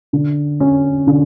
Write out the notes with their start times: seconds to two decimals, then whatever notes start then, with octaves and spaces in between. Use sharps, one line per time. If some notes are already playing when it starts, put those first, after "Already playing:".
0.13 D3
0.60 C#4
1.07 D3